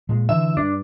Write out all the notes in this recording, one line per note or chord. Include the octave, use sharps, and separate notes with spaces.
A#2 G#3
D3 E3 E5
G2 D4